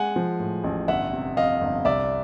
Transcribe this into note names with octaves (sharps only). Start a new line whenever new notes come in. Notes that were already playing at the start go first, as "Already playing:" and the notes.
Already playing: G#3 F#5 G#5
F3
A2
A1
G1 E5 F#5
C3
F2 D#5 F5
G1
C2 D5 E5